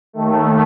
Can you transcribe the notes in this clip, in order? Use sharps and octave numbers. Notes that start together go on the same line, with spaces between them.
D#2 D#3 A3